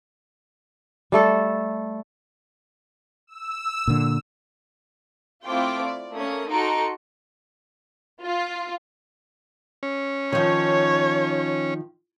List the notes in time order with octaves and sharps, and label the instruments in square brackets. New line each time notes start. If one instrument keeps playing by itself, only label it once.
[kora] G3 A3 A4
[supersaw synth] E6
[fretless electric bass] A#2 D3
[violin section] A3 C4 E4 F4 G5 D6
D5
A3 A#3 C#4 D#6
D#4 F#4 A4 C6 C#7 D7
F4
[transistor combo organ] C#4
[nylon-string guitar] D#3 F3 [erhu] C#5